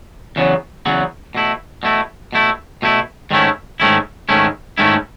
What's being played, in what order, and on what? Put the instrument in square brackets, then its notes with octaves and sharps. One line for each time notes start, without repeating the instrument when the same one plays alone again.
[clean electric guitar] E2 C#3 F#3 B3
E2 C#3 F#3 B3
B2 A3 E4
B2 A3 E4
B2 A3 E4
B2 A3 E4
G#2 D#3 A3 C#4 E4
G#2 D#3 A3 C#4 E4
G#2 D#3 A3 C#4 E4
G#2 D#3 A3 C#4 E4